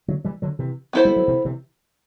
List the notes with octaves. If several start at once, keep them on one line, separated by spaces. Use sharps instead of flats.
D3 F#3
E3 G3
D3 F#3
C3 E3
B3 E4 A4 C5
G3
F#3
C3 E3
C3 E3